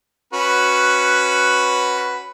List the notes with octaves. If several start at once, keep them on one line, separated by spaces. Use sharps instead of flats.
C#4 F#4 B4